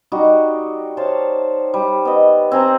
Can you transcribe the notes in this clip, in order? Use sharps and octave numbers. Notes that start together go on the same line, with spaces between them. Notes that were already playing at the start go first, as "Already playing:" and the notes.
G3 D#4 F#4
C5 C#5 F5 A5
G3
B3 D#5
C4 G#5 A#5